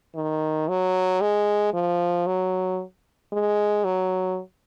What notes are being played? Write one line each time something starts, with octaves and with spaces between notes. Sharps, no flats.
D#3
F#3
G#3
F3
F#3
G#3
F#3